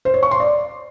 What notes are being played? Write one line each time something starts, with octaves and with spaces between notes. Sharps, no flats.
C5
C#5
C#6
C6
D5